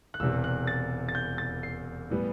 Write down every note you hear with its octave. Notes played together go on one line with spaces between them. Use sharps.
F#6
E1 E2 C3 E6
F#6
A6
A6
G6
A6
C7
A2 E3 G3 B3